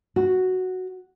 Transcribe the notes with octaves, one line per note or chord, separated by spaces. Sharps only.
F#4